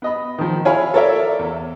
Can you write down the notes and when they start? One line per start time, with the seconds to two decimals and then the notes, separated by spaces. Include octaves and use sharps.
0.02 B3 D#5 B5
0.38 D#3 F3
0.65 E4 C#5 F5 G#5 B5
0.94 A4 A#4 C#5 D5 E5
1.39 E2